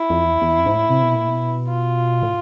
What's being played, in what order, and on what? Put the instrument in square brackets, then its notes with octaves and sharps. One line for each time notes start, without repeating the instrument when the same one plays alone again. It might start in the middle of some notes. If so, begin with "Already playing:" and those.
Already playing: [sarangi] E4
[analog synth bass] F2
E2
E2
F2
G#2
A2
C3
B2
A#2
B2
[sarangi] F4
[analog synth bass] A2